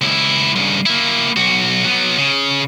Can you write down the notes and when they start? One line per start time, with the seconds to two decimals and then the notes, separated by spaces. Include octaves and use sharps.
0.01 C#2 E4
0.56 G2 C#3
0.86 A#3 E4
1.37 B1 F#4
1.84 F#3 B3
2.17 C#3